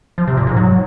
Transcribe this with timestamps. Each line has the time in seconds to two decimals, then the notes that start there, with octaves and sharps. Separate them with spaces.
0.18 F3
0.27 C3
0.37 A#2
0.47 G#2
0.57 F#3